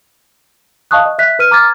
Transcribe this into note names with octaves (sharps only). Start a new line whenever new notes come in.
D#5 F5 A5 C#6 D#6 F#6
D#5
E5 F#6 B6
B4 F6 D#7
A#5 D6 F6 G#6 A6